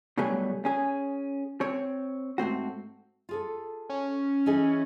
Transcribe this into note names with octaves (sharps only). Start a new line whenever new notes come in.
B2 D3 F#3 G3 A3 G#4
C#4 G#4
C4 C#5
G#2 A3 C4 F#4
F4 G#4 A4
C#4
E3 D#4 G#4